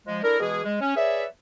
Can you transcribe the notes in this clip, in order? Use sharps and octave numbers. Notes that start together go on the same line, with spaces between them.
F3 G#3
D4 E4 A4 A#4
B2 E3 G#3 G#4
G#3
C#4
G#4 B4 C#5 D5 E5